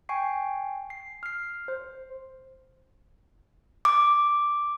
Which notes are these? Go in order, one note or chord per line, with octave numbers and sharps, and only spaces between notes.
G5 G#5 C#6 C7
C7
F6 C7
C5
D6